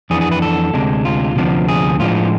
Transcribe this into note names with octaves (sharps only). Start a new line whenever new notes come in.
F2 E3 B3 D4 G#4
G#4
B4
A4
D2 C3 G#3 D4
F4
D2 C3 F3 B3 D4
G#4
A2 F3 G#3 B3 D4 F4